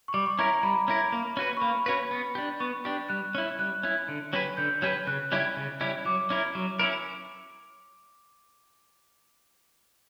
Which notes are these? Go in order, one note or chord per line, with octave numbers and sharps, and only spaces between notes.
C#6
G3 D6
C#6
C#4 E4 A#4 A#5
G3 B5
C#4 E4 A#4
A#3
C#4 F#4 B4
C#6
A#3 B5
C#4 F#4 B4
B3
D4 G4
B3 C#6
D4 G4
G3 F#6
C#4 E4
G3 F#6
C#4 E4
D3
F#3 C#4 G4 B4
D3 G6
F#3 C#4 G4 B4
C#3 F#6
G3 C#4 E4 G4
C#3
G3 C#4 E4 G4
F#3 D6
C#4 E4 A#4
F#3
C#4 E4 A#4